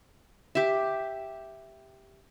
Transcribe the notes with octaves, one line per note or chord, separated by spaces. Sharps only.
G4 E5